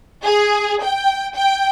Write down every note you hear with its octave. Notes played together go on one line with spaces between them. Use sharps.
G#4
G5
G5